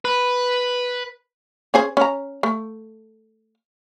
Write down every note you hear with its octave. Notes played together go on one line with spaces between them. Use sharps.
B4
C#4 G#4 C5
C#4 A#5
A3